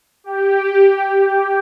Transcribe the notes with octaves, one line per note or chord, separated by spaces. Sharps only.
G4